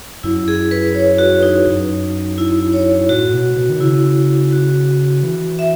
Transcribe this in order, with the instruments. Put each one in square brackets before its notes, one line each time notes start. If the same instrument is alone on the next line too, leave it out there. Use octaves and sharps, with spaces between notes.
[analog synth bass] F#2 [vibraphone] E4
[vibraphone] G#4
B4
C#5
F#4
D#4
[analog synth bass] F#2
[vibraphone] E4
C#5
[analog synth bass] A2 [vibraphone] F#4
[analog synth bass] B2
B2
D#3
[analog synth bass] C#3 [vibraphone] E4
[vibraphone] F#4
[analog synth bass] E3
[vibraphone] E5